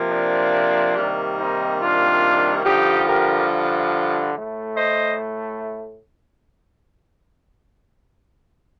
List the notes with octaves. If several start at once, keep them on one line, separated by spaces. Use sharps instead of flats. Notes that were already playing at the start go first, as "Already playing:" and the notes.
Already playing: C3 F3 A#3
D4
C3 D#3 G3 A#3
C4 D#4
D4 F4
G2 D3 F3 D#4 G4
G4 A#4
A2 A3
C5 D#5